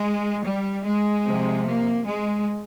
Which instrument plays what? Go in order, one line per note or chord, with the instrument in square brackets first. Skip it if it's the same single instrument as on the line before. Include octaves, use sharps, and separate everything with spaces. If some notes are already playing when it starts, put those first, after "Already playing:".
Already playing: [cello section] G#3
G3
G#3
C3 F3
A#3
G#3